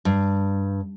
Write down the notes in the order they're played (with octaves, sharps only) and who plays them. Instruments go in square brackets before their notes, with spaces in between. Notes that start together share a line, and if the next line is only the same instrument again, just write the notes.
[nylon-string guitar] G2